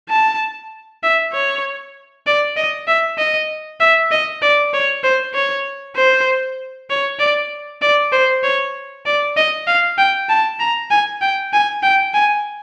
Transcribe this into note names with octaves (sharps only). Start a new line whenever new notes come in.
A5
E5
C#5
D5
D#5
E5
D#5
E5
D#5
D5
C#5
C5
C#5
C5
C#5
D5
D5
C5
C#5
D5
D#5
F5
G5
A5
A#5
G#5
G5
G#5
G5
G#5